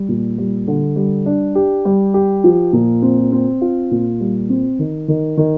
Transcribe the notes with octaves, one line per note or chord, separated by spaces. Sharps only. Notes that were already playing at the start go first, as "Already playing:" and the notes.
Already playing: G3
A#2
G3
D3
G3
D4
G4
G3
G4
F3
A#2
C4
C4
F4
A#2
G3
C4
D#3
D#3
D#3